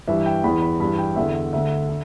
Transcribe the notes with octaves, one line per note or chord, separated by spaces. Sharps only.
G2 E3 E5
G5
E2 E3 B5
B5
G2 E3 B5
G5
E2 D3 E5
E5
D2 D3 E5
D3